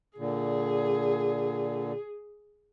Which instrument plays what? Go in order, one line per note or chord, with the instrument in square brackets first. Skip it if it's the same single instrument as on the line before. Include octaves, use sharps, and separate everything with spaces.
[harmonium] A#2 D3 [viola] G#4